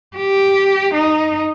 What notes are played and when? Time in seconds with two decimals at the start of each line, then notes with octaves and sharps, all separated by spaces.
0.17 G4
0.94 D#4